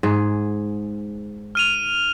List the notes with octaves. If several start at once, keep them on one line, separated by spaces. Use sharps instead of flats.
G#2 G#4
F6 D#7 F7